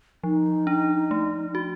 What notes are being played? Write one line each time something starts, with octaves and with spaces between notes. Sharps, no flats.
F3 D#4
D4
A3
F#4